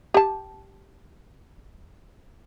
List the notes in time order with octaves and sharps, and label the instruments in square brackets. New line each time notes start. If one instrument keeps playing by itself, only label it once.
[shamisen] G4 A5